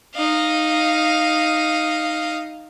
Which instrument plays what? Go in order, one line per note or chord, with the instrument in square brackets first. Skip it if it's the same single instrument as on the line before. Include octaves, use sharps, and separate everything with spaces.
[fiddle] D#4 F5